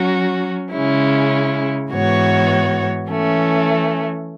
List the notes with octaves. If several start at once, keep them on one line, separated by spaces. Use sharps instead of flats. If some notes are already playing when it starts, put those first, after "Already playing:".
Already playing: F#3 C#4 F#4
C#3 G#3 C#4 E4
G#2 E3 B3 F#4 C#5
E3 A3 C#4